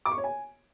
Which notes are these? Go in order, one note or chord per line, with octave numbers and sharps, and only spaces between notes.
D6
C#6
C#5
G#5